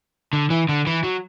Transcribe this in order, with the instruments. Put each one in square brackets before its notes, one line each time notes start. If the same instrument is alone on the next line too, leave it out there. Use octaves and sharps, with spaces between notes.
[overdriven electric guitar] D3
E3
D3
E3
F#3